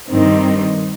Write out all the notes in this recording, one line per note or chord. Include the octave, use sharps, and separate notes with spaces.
G2 D#3 G3 C4 D#4